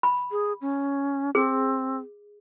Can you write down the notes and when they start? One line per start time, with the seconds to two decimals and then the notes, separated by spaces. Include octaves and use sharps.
0.03 B5
0.31 G#4
0.61 C#4
1.35 C4 G#4